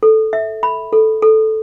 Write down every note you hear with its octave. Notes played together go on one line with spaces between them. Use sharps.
A4
E5
B5
A4
A4